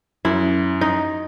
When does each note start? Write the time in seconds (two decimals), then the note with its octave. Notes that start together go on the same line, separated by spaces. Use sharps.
0.25 F#2 E4
0.81 D#4